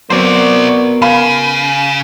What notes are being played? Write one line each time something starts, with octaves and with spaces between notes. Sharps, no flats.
F#3 B3 C4 F#4 A#4 C5 D5
C#3 F5 B5